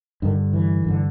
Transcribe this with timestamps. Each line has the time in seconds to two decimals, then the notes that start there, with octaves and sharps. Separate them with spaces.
0.22 G2 D3 D#3
0.53 E3
0.84 G2 D3